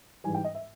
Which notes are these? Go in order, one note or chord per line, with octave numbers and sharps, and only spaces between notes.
G#2 E3 G3 G#5
G5
D#5
E5